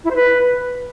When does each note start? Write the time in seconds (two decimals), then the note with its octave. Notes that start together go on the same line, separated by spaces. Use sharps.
0.04 E4
0.10 C5
0.16 B4